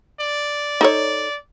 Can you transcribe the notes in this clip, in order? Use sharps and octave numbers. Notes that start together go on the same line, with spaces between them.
D5
D#4 A4 C#5